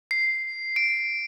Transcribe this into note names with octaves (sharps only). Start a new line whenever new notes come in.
C7
D7